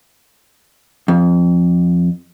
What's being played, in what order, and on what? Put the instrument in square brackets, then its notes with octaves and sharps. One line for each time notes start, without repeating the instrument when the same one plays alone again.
[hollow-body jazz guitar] F2